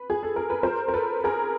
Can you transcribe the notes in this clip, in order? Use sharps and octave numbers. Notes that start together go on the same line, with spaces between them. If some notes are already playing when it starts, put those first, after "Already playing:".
Already playing: B4
G#4
A4
A#4
B4
A#4 C5
A#4
A4 B4
G#4 A#4